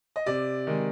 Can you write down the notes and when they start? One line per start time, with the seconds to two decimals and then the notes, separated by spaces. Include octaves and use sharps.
0.16 D#5
0.26 C3 D5
0.67 D#3 G#3